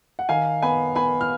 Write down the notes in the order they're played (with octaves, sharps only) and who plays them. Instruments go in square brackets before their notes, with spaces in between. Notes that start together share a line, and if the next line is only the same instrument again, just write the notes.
[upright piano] F#5
D#3 F5 G#5
B3 G#5 B5
B3 G#5 B5
F6